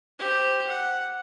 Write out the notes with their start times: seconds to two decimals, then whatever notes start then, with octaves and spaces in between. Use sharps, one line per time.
0.19 G4 C5
0.67 F#5